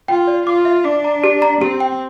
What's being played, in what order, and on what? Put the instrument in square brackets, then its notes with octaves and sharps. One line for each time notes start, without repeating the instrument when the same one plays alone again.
[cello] F4 [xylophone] G5
[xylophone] D5
[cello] F4 [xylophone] D6
[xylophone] E5
[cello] D4 [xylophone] D6
[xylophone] A#5
G4
A#5
[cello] C4 [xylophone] G4
[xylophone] G5